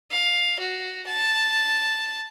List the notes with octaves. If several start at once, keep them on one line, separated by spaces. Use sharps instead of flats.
F5
F#4
A5